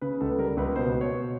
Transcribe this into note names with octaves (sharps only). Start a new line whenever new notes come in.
C#3 B4
C#2 A4
G3 A#4
C#2 B4
B2 C5
B2
C#5
B2